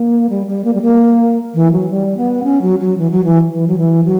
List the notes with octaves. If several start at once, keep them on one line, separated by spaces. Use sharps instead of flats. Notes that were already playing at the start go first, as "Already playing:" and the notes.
Already playing: A#3
G3
G3
A#3
G3
A#3
E3
F#3
G3
B3
C#4
F#3
F#3
E3
F#3
E3
E3
F#3
E3
F#3